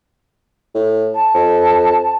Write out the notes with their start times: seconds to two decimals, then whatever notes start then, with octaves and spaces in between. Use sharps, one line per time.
0.75 A2
1.15 A5
1.34 F2